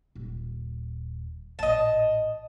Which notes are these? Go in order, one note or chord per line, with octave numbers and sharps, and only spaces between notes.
D#1
A1 A#2 D#5 A5